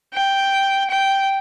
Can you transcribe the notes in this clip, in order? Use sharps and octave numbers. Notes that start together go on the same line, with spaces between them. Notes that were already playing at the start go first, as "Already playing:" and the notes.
G5
G5